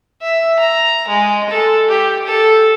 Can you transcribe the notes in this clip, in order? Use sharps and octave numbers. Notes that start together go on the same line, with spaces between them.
E5
A#5
G#3
A4
G4
A4